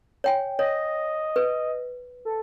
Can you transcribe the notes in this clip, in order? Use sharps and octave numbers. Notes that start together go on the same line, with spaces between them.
C#5 G5 G#5
C#5 D#5
B4
A4